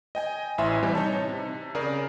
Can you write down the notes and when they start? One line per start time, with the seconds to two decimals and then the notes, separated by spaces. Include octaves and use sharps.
0.15 D#5 G5 G#5
0.58 A1 E4 E5 G#5 C6
0.83 C3 E3 G3
0.95 D#4 C#5 A5
1.29 C3
1.75 C#3 G#4 A#4 D5 A#5